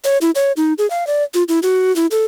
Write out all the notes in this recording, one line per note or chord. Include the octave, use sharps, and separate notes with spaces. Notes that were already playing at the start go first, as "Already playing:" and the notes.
C#5
E4
C#5
D#4
G#4
F5
D5
F4
E4
F#4
E4
A4